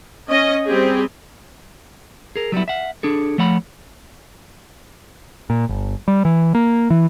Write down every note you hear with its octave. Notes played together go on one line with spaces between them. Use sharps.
C#4 D#5
G3 C4 G4 G#4
G#4 A#4
F#3 G3 B3 E4
E5 F#5
D4 G#4 A4
F3 A3 C#5 F#5 B5
A#2
G1
G3
E3
A#3
E3